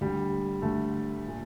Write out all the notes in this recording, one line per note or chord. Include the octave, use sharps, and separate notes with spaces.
D2 D3 G3
D2 D3 A3
A#2